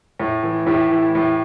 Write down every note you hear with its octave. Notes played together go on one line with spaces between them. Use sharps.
A2
E3
A2 E4 G4
E3
A2